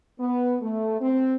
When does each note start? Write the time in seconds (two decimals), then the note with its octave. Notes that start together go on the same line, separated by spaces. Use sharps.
0.20 B3
0.62 A3
1.01 C4